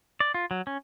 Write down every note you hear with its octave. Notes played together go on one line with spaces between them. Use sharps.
D5
F4
F#3
C#4